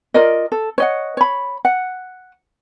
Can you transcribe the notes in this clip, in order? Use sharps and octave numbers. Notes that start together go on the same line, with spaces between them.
F4 A#4 D5 D#5
A4
C#5 D#5 F#5
C#5 B5
F#5